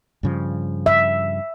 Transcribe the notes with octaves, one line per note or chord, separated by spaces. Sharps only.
G2 C#3 F3
E5